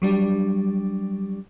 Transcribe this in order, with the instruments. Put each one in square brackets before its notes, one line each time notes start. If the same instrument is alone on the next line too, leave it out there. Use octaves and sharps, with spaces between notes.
[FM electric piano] F#3 G3 D4 G4